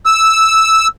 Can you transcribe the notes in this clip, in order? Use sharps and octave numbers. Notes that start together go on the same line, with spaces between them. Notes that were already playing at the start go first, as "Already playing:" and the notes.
E6